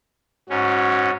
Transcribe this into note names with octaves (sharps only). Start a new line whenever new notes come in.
G#2 C#4 F#4